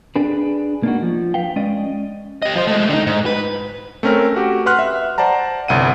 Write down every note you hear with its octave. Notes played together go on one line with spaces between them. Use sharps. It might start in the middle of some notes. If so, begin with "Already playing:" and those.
D4 G#4 B4
A#3 D4 D#4 F#4
F3
B4 F5 G5
G#3 C#4 D5 D#5
G4 D#5
F3 C5
G#3 A3
D3 D#4
G#2
B4
A3 C4 C#4 A#4
F#4 G4
B4 F#5 C6 F6 F#6
E5
C5 D5 F#5 A5 A#5
G1 C2 F#5 D#7